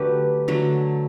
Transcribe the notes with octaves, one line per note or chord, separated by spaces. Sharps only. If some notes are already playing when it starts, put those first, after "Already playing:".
Already playing: D3 F#3 A3 G4 B4
D3 F#3 A3